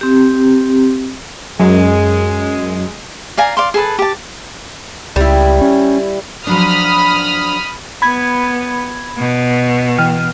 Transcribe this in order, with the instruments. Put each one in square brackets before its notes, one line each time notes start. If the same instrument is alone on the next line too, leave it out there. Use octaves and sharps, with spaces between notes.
[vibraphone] C4 G4
[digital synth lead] F#2 [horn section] G#3
[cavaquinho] D5 F5 G#5 A#5
D5 F5 C6
G#4 A4 B4 A5
G4 A5
[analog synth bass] C#2 [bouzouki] G3 E4
[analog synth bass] C#4
[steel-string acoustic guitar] F3 F#3 D4 [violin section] B5 D#6 F6
[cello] B3 [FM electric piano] B5 G#6
[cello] B2
[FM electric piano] E3 G5 F6